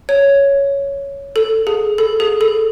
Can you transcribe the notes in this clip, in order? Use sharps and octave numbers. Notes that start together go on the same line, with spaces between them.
C#5
A4
G#4
A4
G#4
A4